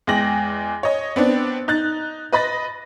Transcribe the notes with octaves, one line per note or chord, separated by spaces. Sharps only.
E2 G#3 G5 A#6 F#7
C#5 D#5
B3 C4 D4
D#4 F#6 A6
B4 D#5 B5 A6 A#6